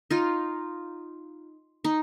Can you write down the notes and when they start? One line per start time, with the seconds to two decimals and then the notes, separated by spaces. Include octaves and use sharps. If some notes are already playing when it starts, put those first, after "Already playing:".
0.11 D#4 F4
1.84 D#4